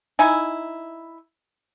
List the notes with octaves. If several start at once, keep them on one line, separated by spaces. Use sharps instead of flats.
D#4 E4 G#5